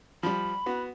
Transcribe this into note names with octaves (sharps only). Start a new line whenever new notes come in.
F3 G3 B5
B3 F#4